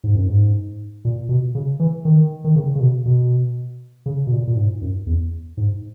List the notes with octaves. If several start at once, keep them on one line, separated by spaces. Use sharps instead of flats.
G#2
F#2
G#2
A#2
B2
C#3
E3
D#3
D#3
C#3
C#3
B2
B2
C#3
B2
A#2
A#2
G#2
F#2
E2
G#2